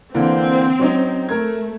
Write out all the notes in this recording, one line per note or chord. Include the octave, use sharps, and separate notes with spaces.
D3 E3 A#3 C4
F#3 C#4 D#4
A3 A#4 G#6